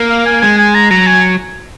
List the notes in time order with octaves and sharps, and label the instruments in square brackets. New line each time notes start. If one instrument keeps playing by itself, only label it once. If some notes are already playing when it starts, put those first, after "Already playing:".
Already playing: [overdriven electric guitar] A#3
[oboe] F5
G#5
[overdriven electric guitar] G#3 [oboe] G#5
[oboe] G#5
A#5
[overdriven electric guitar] F#3 [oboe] A#5
[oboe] G#5